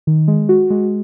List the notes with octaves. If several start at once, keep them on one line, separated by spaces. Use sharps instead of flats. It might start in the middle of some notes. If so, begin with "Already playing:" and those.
D#3
G#3
F#4
G#3